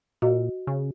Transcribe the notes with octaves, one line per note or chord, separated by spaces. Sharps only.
A#2 F#4 D#5
C#3